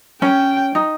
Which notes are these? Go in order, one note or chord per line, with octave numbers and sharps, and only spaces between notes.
C#4 G5
D#4